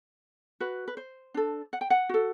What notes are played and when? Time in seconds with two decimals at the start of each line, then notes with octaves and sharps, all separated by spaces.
0.60 F#4 B4
0.88 B4
0.97 C5
1.34 D4 A4
1.73 F#5
1.81 G5
1.90 F#5
2.09 F#4 A4